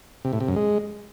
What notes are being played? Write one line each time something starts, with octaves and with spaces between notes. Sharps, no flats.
C3
A2
C3
F#2
G#3